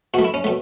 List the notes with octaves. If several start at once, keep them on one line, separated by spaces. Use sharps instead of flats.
B2 A3 F#4
E4
C#4
B2 A3